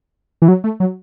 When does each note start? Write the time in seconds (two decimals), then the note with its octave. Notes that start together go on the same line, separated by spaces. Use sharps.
0.42 E3
0.48 F#3
0.64 A3
0.80 F#3